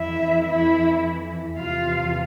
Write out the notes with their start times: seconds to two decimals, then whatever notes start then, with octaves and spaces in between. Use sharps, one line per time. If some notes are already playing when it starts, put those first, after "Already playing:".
Already playing: F2 E3 E4 E5
0.48 E4 E5
1.57 E2 C3 F3 F4 F5